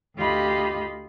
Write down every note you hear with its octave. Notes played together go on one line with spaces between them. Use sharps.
D2 F4 G4 D#5 B5